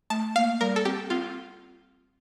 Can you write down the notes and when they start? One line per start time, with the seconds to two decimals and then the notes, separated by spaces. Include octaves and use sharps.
0.10 A3 A5
0.36 A#3 F5
0.61 G3 A#4
0.76 A4
0.85 C4 G4
1.10 C4 F4